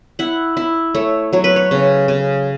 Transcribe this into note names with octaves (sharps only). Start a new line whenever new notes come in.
E4 F#5
E4
A3 C#5
F#3 C#5
B4
C#5
C#3
C#3